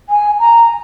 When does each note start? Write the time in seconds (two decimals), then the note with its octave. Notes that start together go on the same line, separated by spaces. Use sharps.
0.09 G#5
0.40 A#5